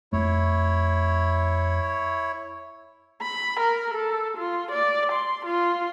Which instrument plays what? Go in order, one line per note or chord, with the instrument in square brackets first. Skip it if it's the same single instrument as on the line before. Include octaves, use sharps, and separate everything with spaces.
[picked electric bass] F2 A3 [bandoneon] E4 C#5
[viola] B5
A#4
A4
F4
D5
C6
F4